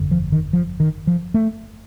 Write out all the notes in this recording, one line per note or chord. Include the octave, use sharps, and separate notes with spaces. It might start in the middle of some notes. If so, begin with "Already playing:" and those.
Already playing: G1 F2 D3
F3
D#3
F3
D#3
F3
A3